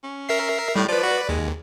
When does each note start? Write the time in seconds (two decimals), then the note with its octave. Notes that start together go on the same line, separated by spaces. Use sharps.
0.03 C#4
0.29 A#4 E5 C7
0.76 A2 G3
0.89 F3 B4 D5
1.03 F#4
1.29 D#2 G#3